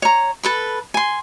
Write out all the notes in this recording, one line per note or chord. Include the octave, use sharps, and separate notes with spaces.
C#5 A#5
A4 B4 B5
G#5 C6